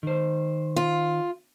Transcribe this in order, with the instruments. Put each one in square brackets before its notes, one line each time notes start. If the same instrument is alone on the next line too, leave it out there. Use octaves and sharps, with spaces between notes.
[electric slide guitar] D#3 C5
[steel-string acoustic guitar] F4